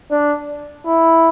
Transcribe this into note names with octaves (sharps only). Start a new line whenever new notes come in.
D4
E4